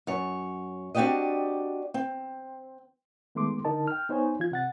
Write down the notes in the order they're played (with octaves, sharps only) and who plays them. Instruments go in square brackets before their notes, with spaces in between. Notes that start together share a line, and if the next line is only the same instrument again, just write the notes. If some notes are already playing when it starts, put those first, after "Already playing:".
[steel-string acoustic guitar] F#2 C#5
C4 D4 F#4 G4 D5 D#5
C4
[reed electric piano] D#3 G#3 A3 B3 C6 D6
D3 D#4 A#4 D#5 A5
G5 F6
B3 D#4 C5 C#5 G#5
E3 F4 G#6
C3 F#5 A6